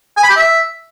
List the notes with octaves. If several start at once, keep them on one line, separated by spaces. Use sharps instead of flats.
G#5
B5
G4
E5